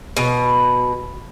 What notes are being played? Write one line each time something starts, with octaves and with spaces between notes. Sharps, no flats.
B2